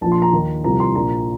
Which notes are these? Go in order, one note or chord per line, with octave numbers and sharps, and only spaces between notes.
A#1 A#2 F3 A5
C6
A#5
D#2 D#3
C2 C3 F3 A#5
C6
A#1 A#2 F3 A#5